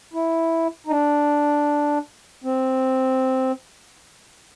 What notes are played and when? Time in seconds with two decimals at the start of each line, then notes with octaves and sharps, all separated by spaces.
0.13 E4
0.87 D#4
0.91 D4
2.44 C4